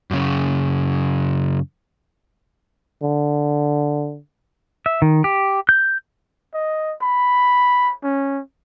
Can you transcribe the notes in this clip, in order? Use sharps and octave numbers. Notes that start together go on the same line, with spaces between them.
F#2 C#3
D3
E5
D#3
G4
G6
D#5
B5
C#4